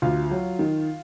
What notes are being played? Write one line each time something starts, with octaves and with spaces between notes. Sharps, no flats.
D2 F4 F5
F#3
D#3